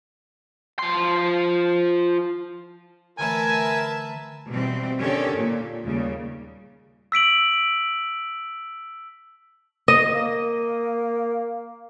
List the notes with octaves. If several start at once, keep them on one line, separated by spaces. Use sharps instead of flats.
F3 C6
D3 E3 A3 A#4 B4 E5 G#5 A5
B2 E3 G3 C4
D3 D#3 C#4 G4 A4 C#5
A#2
D#2 C#3 G3
E6 B6 D7 F#7
D#5
A#3